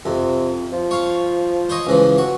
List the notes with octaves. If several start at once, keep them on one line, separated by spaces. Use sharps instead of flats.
F2 C3
F3
C#5 F5
C5 C#5 D#5
C#2 E3 F3
F#4